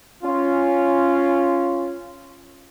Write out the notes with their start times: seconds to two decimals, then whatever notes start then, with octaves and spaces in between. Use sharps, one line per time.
0.23 C#4 F4